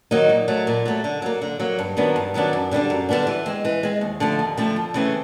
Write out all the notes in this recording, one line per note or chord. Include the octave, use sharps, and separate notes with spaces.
D#3 F#3 A#3 D#4
A#2
F#3 A3
A#2
F#3 A3
D3
F#3 A#3
D3
F#3 A#3
G2
D#3 F#3 B3 D4
G2
D#3 F#3 B3 D4
F#2
D3 G3 B3 D4
F#2
D3 G3 B3 D4
E3
G#3 C4
E3
G#3 C4
D#2
D3 F3 A3 C4
D#2
D3 F3 A3 C4
F2
C#3 E3 A3 C4